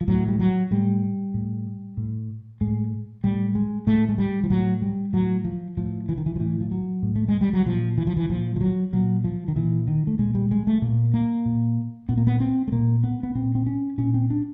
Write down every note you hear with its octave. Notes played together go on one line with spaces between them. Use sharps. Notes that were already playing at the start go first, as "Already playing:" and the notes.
F3
A2 F#3
G3
F#3
A2 G3
A2
A2
A2 G#3
A2 G3
G#3
A2 A3
G#3
G3
F3
A2 F#3
G3
A2 F#3
F3
A2 F3
E3
D#3
E3
F3
A2 E3
F3
F#3
A2
A3
G#3
G3
F#3
A#2 F3
E3
F3
E3
A#2 F3
F3
F#3
A#2 F#3
F3
D#3
A#2 E3
D#3
A3
A#2 G#3
G3
G#3
A3
A#2 A#3
A#3
A#2
A#2 B3
A#3
B3
C4
A3
A#2 A#3
B3
B3
A#2 C4
C4
C#4
A#2 C#4
C4
D4